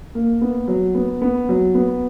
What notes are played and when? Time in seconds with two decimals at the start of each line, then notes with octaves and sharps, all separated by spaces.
0.15 A#3
0.41 B3
0.68 F#3
0.95 B3
1.22 B3
1.49 F#3
1.75 B3